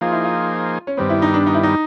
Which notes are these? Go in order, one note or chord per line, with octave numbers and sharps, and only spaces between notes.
F3 A#3 D#4 F4 G#4 C5
E4
F4
C#4
G2 D#3 G3 B3 C4
E4
D#4
D4
D#4
E4
D#4